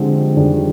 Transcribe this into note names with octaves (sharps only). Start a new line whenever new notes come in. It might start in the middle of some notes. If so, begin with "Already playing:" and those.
Already playing: D3 F3 G#3 C4 G4
F2 D#3 G3 D4 G#4